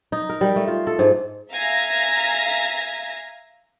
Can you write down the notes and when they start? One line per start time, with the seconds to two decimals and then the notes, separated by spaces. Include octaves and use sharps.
0.12 D#4
0.29 A#4
0.41 G3
0.56 A3
0.68 F4
0.87 A4
0.99 G#2
1.52 E5 F5 G#5 A#5 A#6 B6